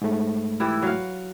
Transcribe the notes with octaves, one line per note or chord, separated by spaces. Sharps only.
G#2 A3
E3 G3 E4
F#3 F5